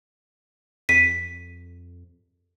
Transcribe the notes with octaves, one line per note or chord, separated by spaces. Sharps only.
F2 B6 D#7